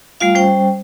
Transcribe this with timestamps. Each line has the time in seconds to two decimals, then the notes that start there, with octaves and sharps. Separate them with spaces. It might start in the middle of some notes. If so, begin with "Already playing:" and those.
0.20 G3 A3 F4 F5
0.35 G3 C#4 C5 G5